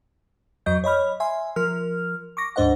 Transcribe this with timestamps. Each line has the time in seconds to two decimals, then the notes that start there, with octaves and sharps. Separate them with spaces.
0.66 F2 F#3 D#5 G6
0.84 C#5 D#5 B5 F6
1.20 E5 G#5 C6
1.56 F3 A#4 F6
2.37 C#6 D6 A#6
2.56 D2 G#2 D4 C5 D#5 F#5